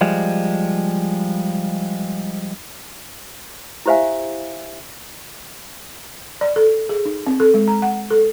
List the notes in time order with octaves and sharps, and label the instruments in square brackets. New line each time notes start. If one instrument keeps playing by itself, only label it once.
[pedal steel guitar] F3 G3 G#3
[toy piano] E4 G4 C5 E5 F5 G#5
[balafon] D5
A4
G#4
D#4
C4
A4
G#3
A#5
F#5
A4